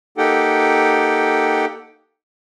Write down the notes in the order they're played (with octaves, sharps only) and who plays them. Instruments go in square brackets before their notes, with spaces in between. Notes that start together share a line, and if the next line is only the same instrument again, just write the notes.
[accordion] A#3 D#4 G4 A4 F#5 G5